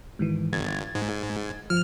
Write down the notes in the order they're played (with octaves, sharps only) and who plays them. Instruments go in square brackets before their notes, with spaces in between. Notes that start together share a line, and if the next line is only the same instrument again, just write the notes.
[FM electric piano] G#2 D#3 E3
[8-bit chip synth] G1 [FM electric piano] G#6 A6
[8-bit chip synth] G#2
[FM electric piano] G1 F3 [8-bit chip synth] F6